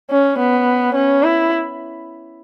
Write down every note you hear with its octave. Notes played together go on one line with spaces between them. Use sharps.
C#4
B3
C#4
E4